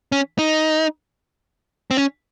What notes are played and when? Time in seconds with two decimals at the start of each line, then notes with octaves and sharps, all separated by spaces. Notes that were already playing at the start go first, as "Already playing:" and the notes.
0.12 C#4
0.39 D#4
1.91 C4
1.97 C#4